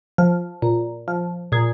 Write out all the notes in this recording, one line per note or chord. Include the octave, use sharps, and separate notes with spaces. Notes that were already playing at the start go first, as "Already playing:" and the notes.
F3
A#2
F3
A#2 G#4